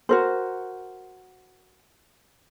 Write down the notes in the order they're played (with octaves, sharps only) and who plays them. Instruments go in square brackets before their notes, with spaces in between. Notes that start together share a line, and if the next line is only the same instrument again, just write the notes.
[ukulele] F#4 A#4 C5